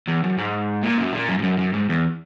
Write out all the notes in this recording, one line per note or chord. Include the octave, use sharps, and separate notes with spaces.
E2
F#2
G#2
A#2
F#2
A#2
F#2
G#2
F#2
F#2
G#2
E2